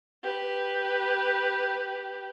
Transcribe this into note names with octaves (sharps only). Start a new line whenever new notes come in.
G4 B4